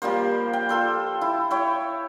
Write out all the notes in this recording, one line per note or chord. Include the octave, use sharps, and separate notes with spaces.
F3 G3 A#3 C5
G5
F4 A4 C5
E4
E4 C#5 G5